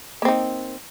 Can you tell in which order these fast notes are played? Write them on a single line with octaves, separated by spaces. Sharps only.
A#3 C4 D#4